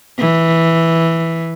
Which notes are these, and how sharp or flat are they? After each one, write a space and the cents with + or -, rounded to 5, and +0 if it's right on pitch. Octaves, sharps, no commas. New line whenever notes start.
E3 +0